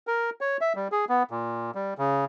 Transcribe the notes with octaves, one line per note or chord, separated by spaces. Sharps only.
A#4
C#5
E5
G3
G#4
B3
A#2
G3
C#3